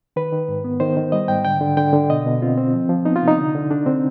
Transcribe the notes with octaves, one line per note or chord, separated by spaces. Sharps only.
D#3 B4
D#3
G#2
B3
D#3 C5
D#3
G3 D#5
G#2 G5
D3 G5
D3
D3 G5
D3
B2 D#5
B2
C4 F4
C4
F3
F3
B3 D#4
F4
C3
D#4
D3
D3
D3 D4
D3 C4